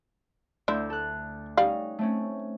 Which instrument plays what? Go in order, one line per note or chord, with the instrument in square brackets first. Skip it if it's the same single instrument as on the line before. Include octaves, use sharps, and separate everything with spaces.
[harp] D2 E6 G6 [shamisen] D3 E4
[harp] A4 F#6
[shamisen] G3 D5 F5 [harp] C#4 D#4
[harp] A3 C4 C#4